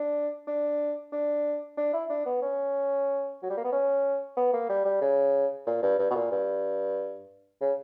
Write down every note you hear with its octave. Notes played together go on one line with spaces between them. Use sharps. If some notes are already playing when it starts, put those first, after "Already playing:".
Already playing: D4
D4
D4
D4
E4
D4
B3
C#4
F#3
G3
A#3
B3
C#4
B3
A#3
G3
G3
C#3
A#2
G2
G2
B2
A#2
G2
C#3